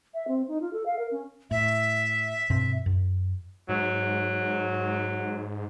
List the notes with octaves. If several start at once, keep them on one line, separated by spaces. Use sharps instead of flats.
E5
C4
D#4
F4
A4
F5
A#4
C#4
A2 E5
G2 B2 C4
F#2
G#2 F#3